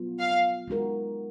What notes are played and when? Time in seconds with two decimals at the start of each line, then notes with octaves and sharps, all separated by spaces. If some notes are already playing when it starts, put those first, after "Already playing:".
Already playing: F#3 B3 F4
0.19 F5
0.68 G#3 D#4 F#4 A#4